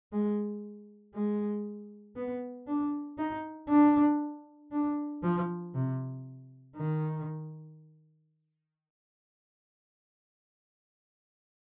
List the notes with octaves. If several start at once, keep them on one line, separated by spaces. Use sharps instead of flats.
G#3
G#3
B3
D4
D#4
D4
D4
F3
C3
D#3